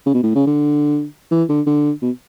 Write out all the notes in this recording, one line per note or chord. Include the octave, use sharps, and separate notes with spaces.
C#3
B2
A2
C#3
D3
E3
D3
D3
B2